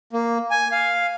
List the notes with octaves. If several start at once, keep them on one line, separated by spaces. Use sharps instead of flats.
A#3
G#5
F5